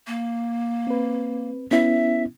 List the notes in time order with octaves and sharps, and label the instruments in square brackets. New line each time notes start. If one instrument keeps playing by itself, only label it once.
[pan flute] A#3
[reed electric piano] C4 B4
[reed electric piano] B3 C#4 E4 [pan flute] E5